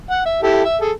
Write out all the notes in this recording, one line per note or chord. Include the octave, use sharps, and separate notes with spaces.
F#5
E5
E4 G4 A4
E5
G#4 A4